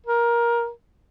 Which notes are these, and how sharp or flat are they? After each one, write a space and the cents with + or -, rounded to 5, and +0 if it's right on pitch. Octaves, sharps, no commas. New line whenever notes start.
A#4 +15